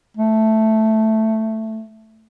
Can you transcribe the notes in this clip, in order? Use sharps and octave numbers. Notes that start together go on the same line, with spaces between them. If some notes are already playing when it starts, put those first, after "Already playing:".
A3